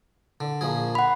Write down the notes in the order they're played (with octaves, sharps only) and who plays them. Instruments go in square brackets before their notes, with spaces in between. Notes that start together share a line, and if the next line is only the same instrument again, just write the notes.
[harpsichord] D3
A#1 F3 G#4
[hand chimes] F#5 B5